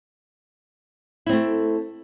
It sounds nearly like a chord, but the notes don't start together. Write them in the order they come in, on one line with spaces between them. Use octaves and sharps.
E4 C4 A3